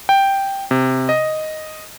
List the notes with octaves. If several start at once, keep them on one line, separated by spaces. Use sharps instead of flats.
G5
C3
D#5